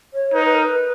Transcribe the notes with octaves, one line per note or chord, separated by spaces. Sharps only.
C#5
D#4 B4
B4
A#4
B4